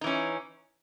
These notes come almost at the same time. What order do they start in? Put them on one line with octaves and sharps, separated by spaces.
D#4 E3 C#4